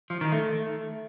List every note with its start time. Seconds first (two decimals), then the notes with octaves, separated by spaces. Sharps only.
0.10 F3
0.21 D#3
0.32 A3